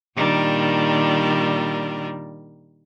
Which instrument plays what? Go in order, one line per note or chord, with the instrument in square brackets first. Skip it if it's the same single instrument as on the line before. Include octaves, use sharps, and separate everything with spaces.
[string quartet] A#2 D#3 G3 D4 A#4